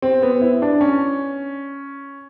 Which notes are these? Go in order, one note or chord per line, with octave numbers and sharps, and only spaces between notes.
C4
B3
E4
D4
C#4